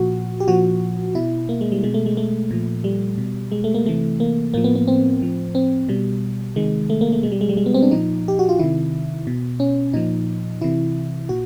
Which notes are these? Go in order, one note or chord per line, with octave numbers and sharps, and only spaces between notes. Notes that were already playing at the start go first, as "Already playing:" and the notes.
Already playing: A#2 F3 F#4
G4
A#2 F3 F#4
B2 E4
A#3
G#3
G3
B2 G#3
A3
G#3
A3
A#2 F3
G3
B2
G#3
A3
A#3
C3 E3 A3
A#3
A2 F3 A#3
B3
B3
C4
A2 F3
C4
B2 G3
C3 D#3 G#3
A3
A#3
A3
B2 G#3
G3
G#3
G3
G#3
B3
C4
D4
A#2 F3 D#4
G4
F#4
F4
C3 D#3 E4
B2
C#4
A#2 F3 D#4
C3 E3 E4
A#2 F#4